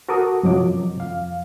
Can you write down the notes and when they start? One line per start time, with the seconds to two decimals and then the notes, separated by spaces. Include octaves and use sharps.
0.09 F#4 A4 A#4 D6 D#6
0.43 F#2 C3 F3 F#3 D#5 D6
0.98 F2 F5